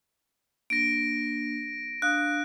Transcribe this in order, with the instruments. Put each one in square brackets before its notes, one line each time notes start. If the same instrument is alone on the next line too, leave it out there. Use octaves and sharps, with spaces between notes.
[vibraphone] A#3 D4 [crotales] A#6 D7
[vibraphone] D4 F5 D#6 [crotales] F#6